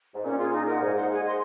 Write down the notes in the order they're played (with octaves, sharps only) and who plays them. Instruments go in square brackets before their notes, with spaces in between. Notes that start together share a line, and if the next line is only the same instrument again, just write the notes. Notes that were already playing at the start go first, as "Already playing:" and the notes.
[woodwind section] G#2
[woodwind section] A#2 [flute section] C#4
[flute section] F4 G#4
D#4
A#4 D#5 F#5
[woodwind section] G#2 [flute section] G#4
[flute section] C5 F#5
G#4
D#5 F#5 C6